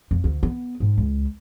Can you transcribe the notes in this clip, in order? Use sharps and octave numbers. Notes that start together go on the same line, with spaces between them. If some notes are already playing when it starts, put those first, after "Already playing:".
F2
D2
B3
G#2
C#2